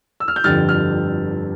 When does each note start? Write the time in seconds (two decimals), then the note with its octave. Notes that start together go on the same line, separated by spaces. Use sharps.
0.20 E6
0.28 F6
0.36 G6
0.44 G1 F2 D3 G3 F6 A6
0.69 F6